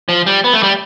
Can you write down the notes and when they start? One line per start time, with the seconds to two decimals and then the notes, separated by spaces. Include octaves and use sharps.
0.09 F3
0.26 G3
0.44 B3
0.54 A3
0.63 G3